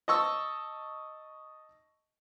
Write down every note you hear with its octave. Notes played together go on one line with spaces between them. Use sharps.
D#5 A5 C#6 E6